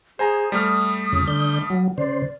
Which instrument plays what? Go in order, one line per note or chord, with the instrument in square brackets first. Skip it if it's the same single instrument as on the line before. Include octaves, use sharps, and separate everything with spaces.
[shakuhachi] G#4 [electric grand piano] C5 G#5 A#5
[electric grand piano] G3 A3 F6 [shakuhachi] D#6
[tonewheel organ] F2 C#3
D3 G6
F#3
[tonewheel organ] C#3 C5 [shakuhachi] D5